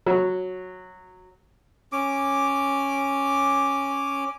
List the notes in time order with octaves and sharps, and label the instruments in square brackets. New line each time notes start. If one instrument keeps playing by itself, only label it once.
[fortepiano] F#3
[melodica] C#4 D6